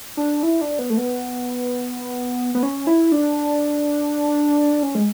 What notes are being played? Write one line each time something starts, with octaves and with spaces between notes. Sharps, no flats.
D4
E4
D4
B3
A3
B3
B3
C#4
E4
D4
C#4
G#3